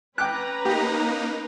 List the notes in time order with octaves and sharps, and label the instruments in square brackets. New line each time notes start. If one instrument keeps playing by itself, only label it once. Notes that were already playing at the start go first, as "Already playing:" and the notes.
[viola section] C#4 B4 A#5 [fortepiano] G5 D6 F#6
[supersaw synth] A#3 D#4 [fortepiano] G4